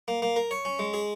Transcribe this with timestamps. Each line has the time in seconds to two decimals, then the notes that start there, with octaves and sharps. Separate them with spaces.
0.08 A#3
0.22 A#3
0.36 A#4
0.51 C#5
0.65 C#4
0.79 G#3
0.94 G#4